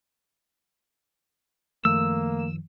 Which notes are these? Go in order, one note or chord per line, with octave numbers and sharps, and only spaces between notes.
F#2 D#3 F3 A3 A#3 E6